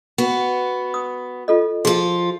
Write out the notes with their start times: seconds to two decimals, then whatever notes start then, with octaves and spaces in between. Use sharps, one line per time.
0.18 B3 F#4
0.94 D#6
1.48 F4 A4 D#5
1.85 F3 F4 G#4